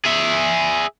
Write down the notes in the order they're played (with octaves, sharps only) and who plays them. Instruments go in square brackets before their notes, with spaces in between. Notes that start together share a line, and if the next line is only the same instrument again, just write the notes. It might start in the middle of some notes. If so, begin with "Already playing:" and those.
[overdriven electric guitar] G#4 E5